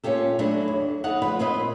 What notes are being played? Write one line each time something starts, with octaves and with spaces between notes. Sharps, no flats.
A#2 C#4 F4 G4 A4
F#3 A3 D4 E4
E2
D#2 B3 D#4 F#5
D2 F3 B4
A#2 C4 E4 B4 C5 D#5